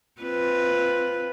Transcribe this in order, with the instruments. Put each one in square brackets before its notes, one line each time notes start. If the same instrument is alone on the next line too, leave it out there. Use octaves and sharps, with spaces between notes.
[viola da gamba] C4 F4 B4